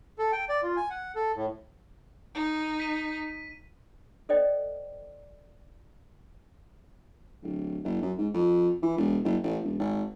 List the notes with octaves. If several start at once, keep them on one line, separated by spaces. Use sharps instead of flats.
A4
G5
D5
F4
G#5
F#5
A4
A2
D#4
B6 D#7
A4 C5 D5 D#5 G5
D1
F#1
F#2
G#2
F2
E3
E1
F#1
A1
E1
G#1